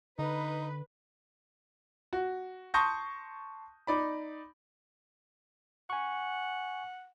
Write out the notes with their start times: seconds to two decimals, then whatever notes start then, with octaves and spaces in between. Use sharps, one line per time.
0.19 D3 D#4 B4
2.13 F#4
2.74 A5 C6 C#6 D#6 G6 A#6
3.87 D#4 D5 B5
5.90 F#5 G#5 C#6